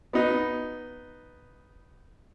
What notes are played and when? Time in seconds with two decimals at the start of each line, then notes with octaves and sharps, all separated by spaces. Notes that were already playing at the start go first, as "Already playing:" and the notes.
0.13 B3 D#4